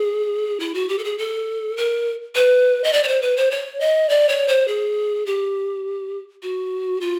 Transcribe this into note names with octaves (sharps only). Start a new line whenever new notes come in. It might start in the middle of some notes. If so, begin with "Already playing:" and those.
Already playing: G#4
E4
F#4
G4
A4
G#4
A4
A#4
B4
D#5
D5
C#5
C5
B4
C5
C#5
D#5
D5
C#5
C5
G#4
G4
F#4
F4